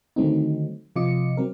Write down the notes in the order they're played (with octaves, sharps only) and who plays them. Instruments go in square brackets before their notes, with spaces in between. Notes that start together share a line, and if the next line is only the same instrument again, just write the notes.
[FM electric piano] D3 D#3 F#3 A3 C4 D#4
C3 F3 F4 D#5 D6 C#7
F#3 C4 A#4